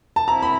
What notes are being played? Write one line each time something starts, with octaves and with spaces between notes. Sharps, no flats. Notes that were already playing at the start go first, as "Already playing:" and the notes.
A5
C4 E4 A#5
B5